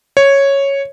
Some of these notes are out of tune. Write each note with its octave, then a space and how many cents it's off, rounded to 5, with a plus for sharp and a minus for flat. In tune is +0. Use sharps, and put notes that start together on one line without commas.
C#5 -5